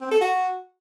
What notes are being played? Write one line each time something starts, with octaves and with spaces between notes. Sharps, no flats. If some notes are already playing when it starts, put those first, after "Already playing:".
C4
A4
F#4